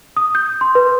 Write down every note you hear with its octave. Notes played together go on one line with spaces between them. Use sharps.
D#6
G6
C6
B4